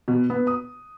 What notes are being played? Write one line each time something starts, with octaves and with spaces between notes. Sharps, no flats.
B2
B3
D#6